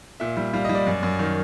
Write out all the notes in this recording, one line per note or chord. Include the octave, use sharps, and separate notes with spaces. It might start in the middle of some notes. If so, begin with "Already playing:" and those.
A#2 E5
G3
G3 F5
G3 D#5
D5
F#2
F#2
D#3